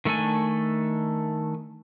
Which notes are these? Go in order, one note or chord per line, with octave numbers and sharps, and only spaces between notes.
D#3 A3 D4 A4 G#5